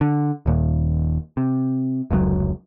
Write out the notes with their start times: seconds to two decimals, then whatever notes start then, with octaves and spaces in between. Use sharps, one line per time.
0.01 D3
0.46 D#1 D#2 A#2
1.37 C3
2.11 F1 C#2 C3 F#3